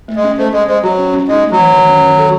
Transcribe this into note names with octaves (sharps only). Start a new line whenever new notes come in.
A3
G#3
C#4
A3 C5
G#3 G#4
G#3 C5
F#3 F#4
C#4
C#4
G#3 D#4
A3
F#3
E3
D#3
C#4
D#3
A4